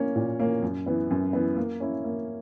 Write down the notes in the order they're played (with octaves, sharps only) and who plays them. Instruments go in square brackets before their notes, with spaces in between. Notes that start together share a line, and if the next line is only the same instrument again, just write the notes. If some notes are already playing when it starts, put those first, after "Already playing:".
Already playing: [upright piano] A#3 C#4
A#2
A#3 C#4
F#2
E3 B3
F#2
E3 B3
A#3
C#4 E4
A#3